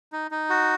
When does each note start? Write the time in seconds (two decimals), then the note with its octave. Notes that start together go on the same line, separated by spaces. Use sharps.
0.13 D#4
0.31 D#4
0.50 F#4